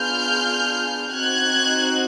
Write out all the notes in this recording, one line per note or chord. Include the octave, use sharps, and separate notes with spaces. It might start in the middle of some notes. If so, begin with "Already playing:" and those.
Already playing: B3 D4 F4 G#4 F6 G6
C4 D#4 F#4 F#6 G#6